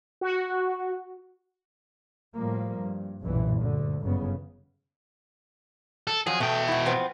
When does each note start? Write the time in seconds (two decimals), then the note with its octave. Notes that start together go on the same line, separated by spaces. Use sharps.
0.21 F#4
2.35 A2 F3 G3 A#3
2.78 G2
3.22 F#1 B1 G2 A#2 E3
3.58 D2 D3
4.01 G1 F#2 C#3 B3
6.07 A4
6.27 F2 F3 F#3 G#4
6.40 B2 A3 G5
6.68 E4 F#4
6.86 F3 B3 C4